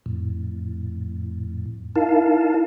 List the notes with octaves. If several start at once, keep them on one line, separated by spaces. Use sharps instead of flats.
F2 A2
D#4 E4 A#4 F5 A5